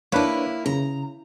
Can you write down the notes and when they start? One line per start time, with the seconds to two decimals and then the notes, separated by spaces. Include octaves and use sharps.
0.12 A#3 D4 E4 B4 C#5
0.66 C#3 A#5